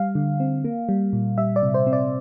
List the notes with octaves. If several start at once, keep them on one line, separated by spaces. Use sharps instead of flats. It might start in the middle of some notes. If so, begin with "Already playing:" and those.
Already playing: G3 F5
D3
C4
A#3
G3
A#2
G3 E5
D5
C3
C5
C4
D5